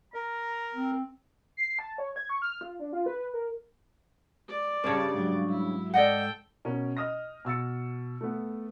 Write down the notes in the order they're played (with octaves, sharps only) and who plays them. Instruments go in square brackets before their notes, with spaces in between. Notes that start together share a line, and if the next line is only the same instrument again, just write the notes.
[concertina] A#4 [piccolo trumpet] A#5
[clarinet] C4
[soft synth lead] C7
A5
C#5
G#6
C#6
F6
F4
D4
F4
B4
A#4
[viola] D5
[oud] G2 C#3 [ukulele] C#4 C#5 [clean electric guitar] A#4 A5
[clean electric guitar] G#2 F#3
[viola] E4
[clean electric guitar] G#2 [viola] A4 G5 [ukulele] D5 D#5 F#5
[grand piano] B2 C#4 A#4
D#5 D#6 F6 A#6
B2 E6 A6 C#7
A3 B3